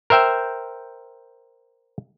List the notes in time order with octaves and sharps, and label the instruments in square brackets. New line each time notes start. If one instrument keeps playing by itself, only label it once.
[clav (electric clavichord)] A#4 C5 E5 G5